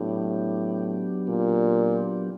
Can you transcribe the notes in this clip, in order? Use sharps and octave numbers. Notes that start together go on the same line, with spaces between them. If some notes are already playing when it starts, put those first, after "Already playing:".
Already playing: A2 F#3 B3 D4 G4
A#2